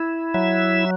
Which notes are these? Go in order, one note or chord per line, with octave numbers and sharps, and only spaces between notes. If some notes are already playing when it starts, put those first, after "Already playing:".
Already playing: E4
F#3 E5